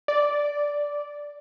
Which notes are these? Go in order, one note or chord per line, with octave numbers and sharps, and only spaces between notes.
D5